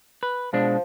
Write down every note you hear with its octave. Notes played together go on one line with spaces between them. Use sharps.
B4
B2 F3 G#3 D4